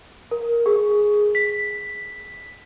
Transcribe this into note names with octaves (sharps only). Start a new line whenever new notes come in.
A#4
G#4
B6